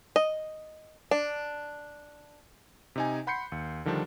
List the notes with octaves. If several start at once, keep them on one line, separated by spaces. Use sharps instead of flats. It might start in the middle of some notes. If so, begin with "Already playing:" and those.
D#5
D4
C3 D#4 G#5
F#5 B5 C6 G6 C7 C#7
D#2
D3 D#3 F3 G3 D4